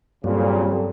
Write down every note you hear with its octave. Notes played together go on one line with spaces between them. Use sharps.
G2 A#2 C#3 F#3 G3 C4 G4 A4